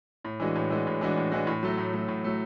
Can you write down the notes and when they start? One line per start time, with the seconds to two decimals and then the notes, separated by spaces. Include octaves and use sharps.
0.24 A2
0.40 E3 G#3 D4 F#4
0.55 A2
0.70 E3 G#3 D4 F#4
0.87 A2
1.01 E3 G#3 D4 F#4
1.17 A2
1.32 E3 G#3 D4 F#4
1.47 A2
1.63 F#3 A3
1.78 A2
1.94 F#3 A3
2.08 A2
2.24 F#3 A3